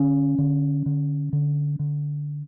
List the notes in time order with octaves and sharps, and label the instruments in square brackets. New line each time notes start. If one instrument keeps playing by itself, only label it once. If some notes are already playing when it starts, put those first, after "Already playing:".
Already playing: [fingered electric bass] D3 C#4
D3
D3
D3
D3